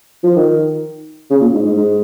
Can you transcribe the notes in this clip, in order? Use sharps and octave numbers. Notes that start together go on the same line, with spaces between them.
F3
D#3
C#3
A#2
G#2
G#2
G#2